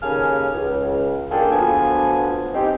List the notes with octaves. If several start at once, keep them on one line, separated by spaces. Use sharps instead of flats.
D#2 C#3 A4 G#5 F6
C#2
A#3 D4 F4 G#4 A4 G5
D2 F3 B3 G#5
C4 D#4 G4